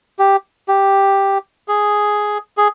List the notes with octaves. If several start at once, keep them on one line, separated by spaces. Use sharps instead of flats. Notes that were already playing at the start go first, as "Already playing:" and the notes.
G4
G4
G#4
G#4